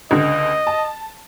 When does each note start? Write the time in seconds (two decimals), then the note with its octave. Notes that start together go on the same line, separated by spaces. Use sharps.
0.11 C#2 D3 D#5
0.67 A5